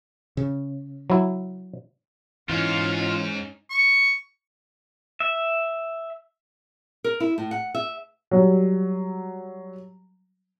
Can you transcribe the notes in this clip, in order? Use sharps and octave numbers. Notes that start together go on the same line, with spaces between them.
C#3
F#3 E4
G#2 E3 C#4 D#4 F4
C#6
E5
A#4
E4
A2
F#5
E5
F#3 G3